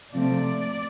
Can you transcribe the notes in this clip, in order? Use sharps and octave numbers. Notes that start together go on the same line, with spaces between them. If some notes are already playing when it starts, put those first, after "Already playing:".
C3 F3 A3 C4 D5